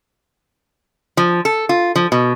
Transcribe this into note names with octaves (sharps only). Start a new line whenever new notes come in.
F3
A4
F4
F3
B2